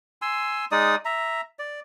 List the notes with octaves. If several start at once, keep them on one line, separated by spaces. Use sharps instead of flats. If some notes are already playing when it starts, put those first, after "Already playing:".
G#5 C6 E6
G#3 D#4 D5 D#6
E5 A#5
D5